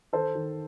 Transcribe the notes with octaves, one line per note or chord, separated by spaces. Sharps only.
D#3 A4 C5
D#3